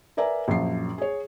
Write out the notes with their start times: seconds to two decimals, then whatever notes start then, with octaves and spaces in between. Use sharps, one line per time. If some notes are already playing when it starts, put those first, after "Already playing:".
0.17 A#4 B4 D5 E5 G#5 A#5
0.48 A#1 F#2 F3 C7
0.98 G#4 C#5